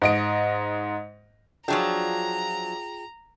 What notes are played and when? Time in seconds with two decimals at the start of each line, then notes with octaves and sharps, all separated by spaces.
0.02 G#2 D#5 D7
1.68 F3 F#3 D4 F4 G#4 G5 A#5